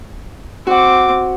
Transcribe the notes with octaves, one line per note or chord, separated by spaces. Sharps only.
C4 F#4 F#5 D6